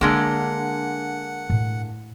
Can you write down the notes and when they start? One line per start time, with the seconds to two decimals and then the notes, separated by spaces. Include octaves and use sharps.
0.01 D3 G#3 A#3 D4 F#5
1.50 A2